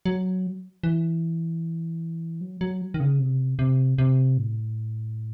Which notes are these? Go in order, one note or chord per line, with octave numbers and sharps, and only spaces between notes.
F#3
E3
F#3
F#3
D#3
C#3
C3
C3
C3
A2